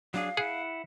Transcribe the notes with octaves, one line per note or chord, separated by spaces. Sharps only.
F#3 D4 G#4 F5
E4 G#4 F#5